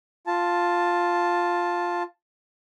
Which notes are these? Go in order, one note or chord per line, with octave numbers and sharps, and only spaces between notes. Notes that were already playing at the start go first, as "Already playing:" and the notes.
F4 A5